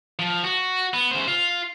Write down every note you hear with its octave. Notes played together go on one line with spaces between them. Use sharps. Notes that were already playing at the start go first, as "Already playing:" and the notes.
F3
F#4
B3
C#3 C5
F4